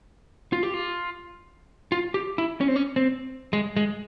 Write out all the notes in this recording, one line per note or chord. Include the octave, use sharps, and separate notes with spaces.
F4
G4
F4
F4
G4
E4
C#4
C4
C#4
C4
G#3
G#3